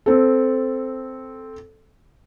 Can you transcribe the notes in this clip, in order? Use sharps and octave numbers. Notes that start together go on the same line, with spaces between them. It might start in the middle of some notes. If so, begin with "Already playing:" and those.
C4 A4